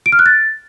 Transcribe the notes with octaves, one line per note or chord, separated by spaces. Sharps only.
D7
F6
F#6
A6